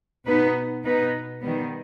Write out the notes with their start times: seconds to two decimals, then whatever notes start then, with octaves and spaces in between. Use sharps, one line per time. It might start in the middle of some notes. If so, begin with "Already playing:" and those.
0.26 B2 B3 D#4 B4
0.84 B2 B3 D#4 B4
1.42 D#3 G3 B3